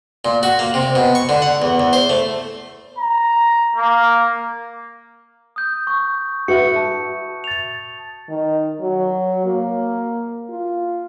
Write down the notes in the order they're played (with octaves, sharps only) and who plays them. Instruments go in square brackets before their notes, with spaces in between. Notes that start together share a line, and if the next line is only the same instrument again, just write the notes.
[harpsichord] A#2
F#4
A#3
C3
B2
C#6
D3
F#5
E2
E2
C5
A3
[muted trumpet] A#5
A#3
[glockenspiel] D#6 G6
C#6
[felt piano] F#4 B4 E5 [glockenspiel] C#7
[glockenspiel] A5
A6 F7
[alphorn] D#3
F#3
A#3
F4